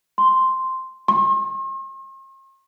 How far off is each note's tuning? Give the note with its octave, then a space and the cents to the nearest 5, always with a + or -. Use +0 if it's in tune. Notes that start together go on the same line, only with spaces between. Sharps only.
C6 -5
C6 +45